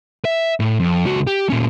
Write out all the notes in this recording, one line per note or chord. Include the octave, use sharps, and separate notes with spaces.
E5
A2
F2
C#2 F#4
G4
A#2 C#4